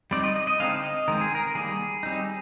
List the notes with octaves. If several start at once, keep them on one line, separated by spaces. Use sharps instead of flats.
G3 C4 D#4 D5
D#5
D#5
D#5
D3 G#3 C4 D#4 F5
D#5
D#3 G#3 C4 A#4
G#4
A#4
D#3 G3 A#3 G#4
G3 C4 D#4